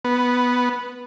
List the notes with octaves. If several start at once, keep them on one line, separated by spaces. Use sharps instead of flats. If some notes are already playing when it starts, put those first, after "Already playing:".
B3